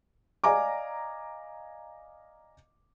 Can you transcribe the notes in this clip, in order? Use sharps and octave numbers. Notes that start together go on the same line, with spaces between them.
D5 D#5 F5 G#5 A#5 D6